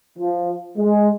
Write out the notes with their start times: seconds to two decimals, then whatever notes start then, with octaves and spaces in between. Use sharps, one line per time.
0.19 F3
0.78 G#3